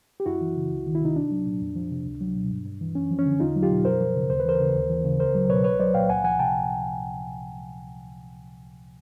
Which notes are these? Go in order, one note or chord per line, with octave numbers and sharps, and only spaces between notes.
G4
F#2 E4 F#4
E3
C#3
C#2
D#3
E4
C3 D#4
C2 D4
F#3
A#2
F2
F3
C3
C#2
F#3
B2
G2
G2
E3
F#2 C#4
F3
C#4
D3
E2 D#4 F4
F#3
F4 G4
B2
F#2 A#4 C5
F3
C#3
D#2 C5
B4
E3 A#4 C5
C#3
D#2
E3
C#3
C#2 A#4 C5
F#3
B2 B4 C#5
C2 B4 C#5
F#3 C5 D5
A#2 F5 G5
C#2 F#5 G#5
F3 F#5 G#5
C3 G5 A5